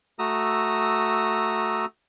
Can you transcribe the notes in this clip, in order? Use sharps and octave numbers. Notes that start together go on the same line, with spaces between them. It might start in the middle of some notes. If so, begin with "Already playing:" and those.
A3 F#4 A#5 D#6 E6